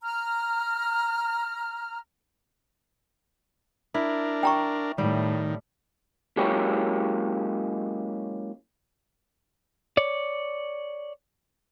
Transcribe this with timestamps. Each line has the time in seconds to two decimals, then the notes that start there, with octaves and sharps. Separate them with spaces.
0.03 A#5 F6
3.94 D4 E4 A#4
4.43 G5 A#5 C#6
4.98 A2 D#3 G3
6.37 F#3 G#3 A#3 C#4 E4 G4
9.97 C#5 D5